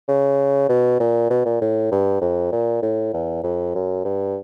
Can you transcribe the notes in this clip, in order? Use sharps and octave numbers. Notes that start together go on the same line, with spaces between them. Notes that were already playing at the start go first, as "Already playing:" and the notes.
C#3
B2
A#2
B2
A#2
A2
G2
F2
A#2
A2
E2
F2
F#2
G2